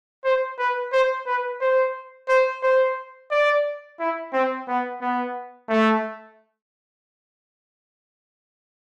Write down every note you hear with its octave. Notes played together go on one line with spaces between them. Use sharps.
C5
B4
C5
B4
C5
C5
C5
D5
E4
C4
B3
B3
A3